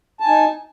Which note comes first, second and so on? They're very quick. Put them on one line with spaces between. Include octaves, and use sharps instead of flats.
A5 G#5 D#4